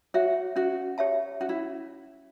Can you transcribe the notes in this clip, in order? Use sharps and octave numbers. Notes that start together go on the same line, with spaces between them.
F#4 C#5 E5
C#4 F#4
G4 C#5 E5 A5
C#4 F#4
E4